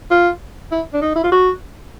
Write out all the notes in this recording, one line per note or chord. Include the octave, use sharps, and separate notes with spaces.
F4
E4
D4
D#4
E4
F4
F#4